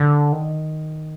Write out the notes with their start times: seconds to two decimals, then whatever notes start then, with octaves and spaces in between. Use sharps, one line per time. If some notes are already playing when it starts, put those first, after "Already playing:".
Already playing: D3
0.32 D#3